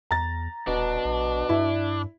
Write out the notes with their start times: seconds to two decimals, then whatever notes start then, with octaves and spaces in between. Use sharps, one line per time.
0.11 E2 A#5 A6
0.67 D#1 B2 D4
1.05 A#1
1.49 G2 E4